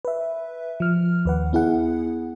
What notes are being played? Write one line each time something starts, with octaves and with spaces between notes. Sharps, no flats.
B4 E5
F3 F6
D#2 B4 F#5
B3 E4 G#4 F#5